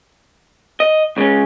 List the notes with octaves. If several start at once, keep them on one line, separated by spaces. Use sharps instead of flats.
D#5
C#2 C#3 G#3 C#4